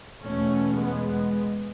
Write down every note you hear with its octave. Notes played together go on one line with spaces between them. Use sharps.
E2 B2 A3 C#4
G#3 B3